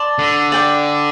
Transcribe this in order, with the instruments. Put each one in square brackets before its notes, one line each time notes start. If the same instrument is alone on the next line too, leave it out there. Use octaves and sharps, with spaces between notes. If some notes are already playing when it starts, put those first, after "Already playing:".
Already playing: [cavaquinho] D5 A5 C6
[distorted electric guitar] D3
[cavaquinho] D5 G5 D6